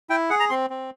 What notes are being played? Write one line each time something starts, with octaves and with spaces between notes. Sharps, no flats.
E4 G5
G#4 F#5
A#5
C4 C6
C4